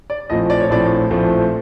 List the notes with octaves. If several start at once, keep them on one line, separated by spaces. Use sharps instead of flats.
D5
A#1 A2 F3 A3 C4 D#5
D5
C#5
A#1 A2 F3 A3 C4 D5
A#1 A2 F3 A3 C4